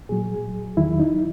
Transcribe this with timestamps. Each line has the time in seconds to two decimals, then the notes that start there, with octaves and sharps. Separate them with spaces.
0.09 A#2 F#3 G#4
0.77 E2 D#3 F#3 E4
1.00 D#4